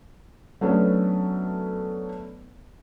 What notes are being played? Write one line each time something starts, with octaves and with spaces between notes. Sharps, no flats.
F#3 A3 B3 C#4 D4